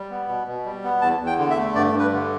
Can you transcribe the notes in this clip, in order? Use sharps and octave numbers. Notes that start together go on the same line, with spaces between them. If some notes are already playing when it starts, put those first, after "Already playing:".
Already playing: G3
B3
B2
B2
G3
B3
E2 A5
E2
G5
D3
E5
A3
G2 D5
G2
B4
D3